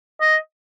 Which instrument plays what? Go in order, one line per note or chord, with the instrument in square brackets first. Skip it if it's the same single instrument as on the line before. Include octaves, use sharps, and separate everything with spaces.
[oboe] D#5